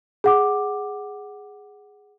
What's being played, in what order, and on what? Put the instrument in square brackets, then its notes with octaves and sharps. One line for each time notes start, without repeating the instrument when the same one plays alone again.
[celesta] G#4 F#5 D6